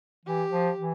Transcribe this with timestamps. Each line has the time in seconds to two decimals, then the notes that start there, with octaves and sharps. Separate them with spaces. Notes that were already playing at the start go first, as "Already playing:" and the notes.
0.25 E3 G4
0.52 F3
0.77 E3